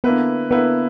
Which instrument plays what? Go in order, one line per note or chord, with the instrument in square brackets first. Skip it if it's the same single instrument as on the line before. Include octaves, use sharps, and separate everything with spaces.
[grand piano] D3 A#3 E4 B4 [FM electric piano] B3
[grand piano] D3 A#3 E4 B4 [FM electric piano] B3